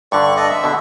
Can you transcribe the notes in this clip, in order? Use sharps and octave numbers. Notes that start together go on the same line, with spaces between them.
G2 D3 D5 C#6
A4 D5 D#5
E5
B2 D3